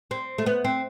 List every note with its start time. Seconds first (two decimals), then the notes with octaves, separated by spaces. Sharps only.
0.11 C4
0.38 A3
0.46 B3
0.65 C4